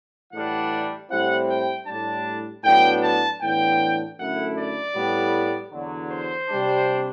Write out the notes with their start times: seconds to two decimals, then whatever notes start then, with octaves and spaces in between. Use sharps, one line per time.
0.32 A2 E3 G3 D4 F#5
1.10 A2 G3 C4 E4 F#5
1.48 G5
1.86 A2 G3 D4 A5
2.64 A2 F#3 B3 D4 G5
3.03 A5
3.41 A2 E3 B3 D4 G5
4.18 F#2 D3 A3 E4 F#5
4.57 D5
4.95 A2 G3 B3
5.72 E2 D3 F#3
6.10 C5
6.49 C3 G3 D4